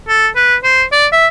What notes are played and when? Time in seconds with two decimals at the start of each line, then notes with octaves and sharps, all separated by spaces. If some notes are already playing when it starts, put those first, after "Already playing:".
0.08 A4
0.36 B4
0.64 C5
0.92 D5
1.13 E5